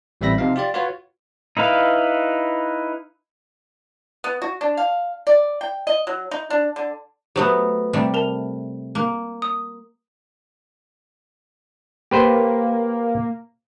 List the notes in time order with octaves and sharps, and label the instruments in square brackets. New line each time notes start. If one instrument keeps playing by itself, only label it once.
[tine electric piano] A1 G3 C4 E5 B5 A#6
C3 F3 D#4 F5
F4 G4 D5
F4 F#4 B4 C#5
[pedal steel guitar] D#4 E4 B4 F5
[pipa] B3
F#4
D4
F5
D5
G5
D#5
F#3
D#4
D4
D3
[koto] F#3 A3 B3 [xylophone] G4 C5 D#6
[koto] C3 G3 A3
[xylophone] A#4 A5 F7
[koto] A#3
[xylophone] D#6
[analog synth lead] A#3 [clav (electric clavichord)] G4 B4 C5